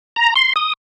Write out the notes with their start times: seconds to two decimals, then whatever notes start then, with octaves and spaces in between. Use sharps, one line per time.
0.16 A#5
0.36 C6
0.56 D#6